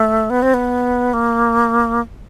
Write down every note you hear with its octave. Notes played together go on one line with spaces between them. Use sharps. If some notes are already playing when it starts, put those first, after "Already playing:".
Already playing: A3
B3
C4
B3
A#3